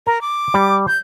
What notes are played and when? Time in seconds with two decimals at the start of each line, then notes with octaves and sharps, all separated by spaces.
0.07 A#4 A#5
0.21 D6
0.54 G3
0.88 G6